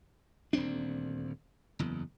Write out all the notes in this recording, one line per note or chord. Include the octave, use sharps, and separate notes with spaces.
D#1 D2 C4 D4
F#1 E2